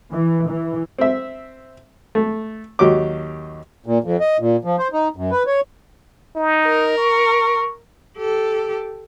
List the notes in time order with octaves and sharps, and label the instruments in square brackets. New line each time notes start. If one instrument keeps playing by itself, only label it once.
[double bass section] E3
E3
[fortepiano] C4 E5
A3
D#2 F#3 G4 D6
[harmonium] A#2
F2
D#5
A#2
F3
C5
D#4
F#2
B4
C#5
[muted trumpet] D#4
[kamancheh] A#4
[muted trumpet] C#6
[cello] G4 A4